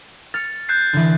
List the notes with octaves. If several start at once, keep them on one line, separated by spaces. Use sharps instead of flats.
F6 A6 C#7
F#6 G6 C7
D3 E3